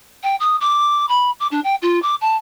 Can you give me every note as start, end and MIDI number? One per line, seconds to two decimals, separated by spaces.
0.23 0.35 79
0.40 0.56 87
0.60 1.07 86
1.09 1.30 83
1.39 1.47 86
1.51 1.60 62
1.64 1.75 79
1.82 2.01 65
2.02 2.15 86
2.21 2.35 81